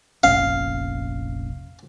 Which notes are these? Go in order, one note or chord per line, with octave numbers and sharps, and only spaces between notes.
F1 A#1 C#4 F5